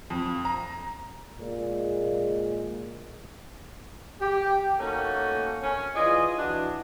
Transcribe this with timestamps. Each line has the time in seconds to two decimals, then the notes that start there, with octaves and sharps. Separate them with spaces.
0.10 F2
0.45 A#5
1.40 A#2 G#3
4.21 G4
4.79 A3 A#3 C#4 D#4 F#4 A4
5.62 C#4 C#5
5.94 E3 F4 G#4 D5 D#5
6.38 E3 D4 F#4